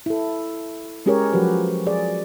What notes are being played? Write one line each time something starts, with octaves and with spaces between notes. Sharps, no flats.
E4 A4
G#3 C#4 G4 G#4 A#4 C#5
F3 F#3 F#4 G4 B4
G#4 D5